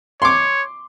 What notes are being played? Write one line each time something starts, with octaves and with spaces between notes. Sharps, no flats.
C#5 C6 D6